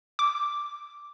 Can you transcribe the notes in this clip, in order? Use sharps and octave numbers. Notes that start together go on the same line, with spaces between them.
D6